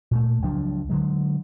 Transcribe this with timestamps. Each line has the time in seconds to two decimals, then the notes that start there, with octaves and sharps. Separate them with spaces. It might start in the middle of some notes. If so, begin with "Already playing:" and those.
0.11 A#2 A3
0.42 C#2 F3 F#3 D4
0.89 D3 F#3 G#3